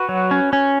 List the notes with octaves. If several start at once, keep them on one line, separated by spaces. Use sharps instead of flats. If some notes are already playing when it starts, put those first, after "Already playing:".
Already playing: F#4 B4
F#3
C#4
C#4